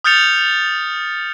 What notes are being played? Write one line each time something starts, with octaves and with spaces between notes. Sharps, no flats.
D#6 F6 G6 A6 C#7 F7